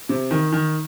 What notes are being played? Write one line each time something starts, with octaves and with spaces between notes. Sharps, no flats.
C3
D#3
D#3